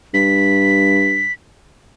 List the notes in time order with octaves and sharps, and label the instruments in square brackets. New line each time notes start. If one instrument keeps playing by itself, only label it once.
[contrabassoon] G2 [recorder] B6